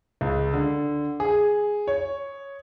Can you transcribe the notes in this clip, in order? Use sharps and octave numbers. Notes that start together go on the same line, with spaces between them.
C#2
D3
G#4
C#5